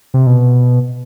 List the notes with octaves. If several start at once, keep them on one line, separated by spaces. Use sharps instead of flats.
C3
B2